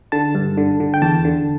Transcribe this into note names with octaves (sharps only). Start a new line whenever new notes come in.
D3 A5
G2
D3
D3
G5
E2 A5
D3